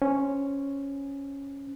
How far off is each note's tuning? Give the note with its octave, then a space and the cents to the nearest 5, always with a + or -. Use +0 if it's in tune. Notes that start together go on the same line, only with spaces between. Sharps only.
C#4 +0 C5 +0